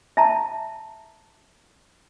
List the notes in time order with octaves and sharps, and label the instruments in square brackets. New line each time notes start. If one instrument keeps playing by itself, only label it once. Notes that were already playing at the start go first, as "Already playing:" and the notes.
[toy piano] E5 A5 A#5